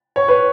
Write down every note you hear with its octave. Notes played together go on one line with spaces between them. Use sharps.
C#5
B4